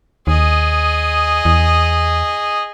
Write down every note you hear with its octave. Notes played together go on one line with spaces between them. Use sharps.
D#2 G#4 D#5
E2